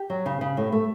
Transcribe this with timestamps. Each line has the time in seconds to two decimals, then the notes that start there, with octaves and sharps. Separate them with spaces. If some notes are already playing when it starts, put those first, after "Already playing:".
Already playing: G4
0.10 F#3
0.26 C#3
0.41 C#3
0.57 A2
0.72 A3